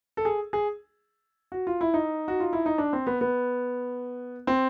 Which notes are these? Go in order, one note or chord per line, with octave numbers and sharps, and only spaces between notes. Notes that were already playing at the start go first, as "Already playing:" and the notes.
A4
G#4
G#4
F#4
F4
E4
D#4
F#4
F4
E4
D#4
D4
C4
B3
B3
C4